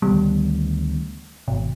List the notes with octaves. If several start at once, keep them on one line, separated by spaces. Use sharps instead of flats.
D2 D#3 G3 B3
G#1 B2